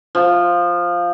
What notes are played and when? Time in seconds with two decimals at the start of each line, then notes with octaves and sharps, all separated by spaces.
0.15 F3